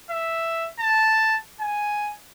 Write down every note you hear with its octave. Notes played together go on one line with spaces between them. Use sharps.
E5
A5
G#5